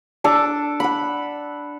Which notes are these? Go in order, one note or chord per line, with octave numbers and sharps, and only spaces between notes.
D4 A4 D6
F#5 B5